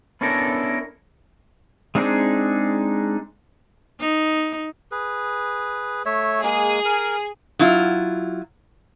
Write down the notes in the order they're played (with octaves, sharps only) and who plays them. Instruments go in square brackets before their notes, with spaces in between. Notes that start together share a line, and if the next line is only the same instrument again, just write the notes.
[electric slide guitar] B3 C#4 D4 E4 A4 A#4
[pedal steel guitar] G#3 C4 D4 D#4 G#4
[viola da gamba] D#4
[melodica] G#4 B4
A3 C#5 E5
[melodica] G#3 A#3 [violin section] G#4
[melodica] A#4
[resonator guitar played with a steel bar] F#3 E4 F4